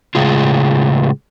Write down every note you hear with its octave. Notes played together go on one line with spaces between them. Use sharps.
A2 C#3 G#3 F4